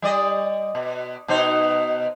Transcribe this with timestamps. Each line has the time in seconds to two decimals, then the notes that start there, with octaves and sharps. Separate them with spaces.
0.02 G3 D5 D#5
0.75 B2
1.28 B2 D#4 C5